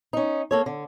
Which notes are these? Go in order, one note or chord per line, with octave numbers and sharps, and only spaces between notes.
C#4 D#4
A#3 A4 C#5
D3